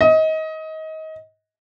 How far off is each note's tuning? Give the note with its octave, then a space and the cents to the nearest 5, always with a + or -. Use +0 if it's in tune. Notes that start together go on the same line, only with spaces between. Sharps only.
D#5 +25